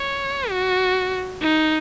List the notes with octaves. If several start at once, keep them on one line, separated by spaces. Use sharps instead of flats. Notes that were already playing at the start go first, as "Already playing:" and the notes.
Already playing: C#5
F#4
D#4